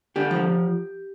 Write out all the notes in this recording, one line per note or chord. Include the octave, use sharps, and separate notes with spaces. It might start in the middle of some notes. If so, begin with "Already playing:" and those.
D3 G4
F3